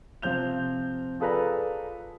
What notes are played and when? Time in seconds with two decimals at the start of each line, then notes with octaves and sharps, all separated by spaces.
0.22 C3 F3 C4 G6 F7
1.20 F4 G#4 A4 B4 D5 A#5